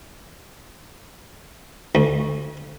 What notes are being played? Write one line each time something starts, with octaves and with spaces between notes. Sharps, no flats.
D2